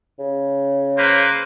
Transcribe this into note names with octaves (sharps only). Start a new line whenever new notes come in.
C#3
A#3 B4 C5